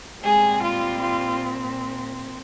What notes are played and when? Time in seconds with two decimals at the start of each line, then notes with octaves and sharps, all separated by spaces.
0.23 A#2 G3 G#3 C4 G#4
0.61 F4
1.01 F4